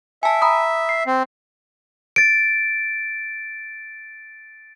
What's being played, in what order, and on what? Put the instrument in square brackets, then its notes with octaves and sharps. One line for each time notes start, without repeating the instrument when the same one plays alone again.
[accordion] E5 [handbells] G#5 A5
[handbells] A#5 B5 D#6
C7
[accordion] C4
[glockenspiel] A6 D7